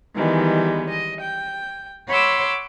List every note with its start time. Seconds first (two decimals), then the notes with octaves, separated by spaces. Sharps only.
0.16 D#3 E3 G3 G#3 B3
0.90 D#5
1.20 G5
2.08 C#5 F#5 B5 C6 D6 E6